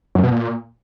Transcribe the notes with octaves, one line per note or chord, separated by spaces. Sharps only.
F#2
B2
A#2